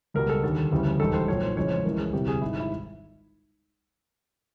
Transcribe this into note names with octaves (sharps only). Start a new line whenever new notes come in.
C#2 B2 G3 A#4
A4
D#2 D3 G3 A4
D2 C#3 E3 G3
E1 D#2 D#3 G3 A4
C5
B1 A#2 F#3 C#5
C5
F2 C#3 E3 G#3 C#5
C5
C#2 C#3 E3 G#3 A#4
G#4
E1 D2 C3 E3 G3 G4
G#4
G#1 G#2 D#3 E4
E4